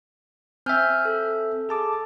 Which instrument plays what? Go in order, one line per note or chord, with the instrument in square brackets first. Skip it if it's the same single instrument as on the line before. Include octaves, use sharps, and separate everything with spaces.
[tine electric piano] C4 E5 [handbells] G#5 F6 G6
[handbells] A4
[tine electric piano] G#4 A5 D6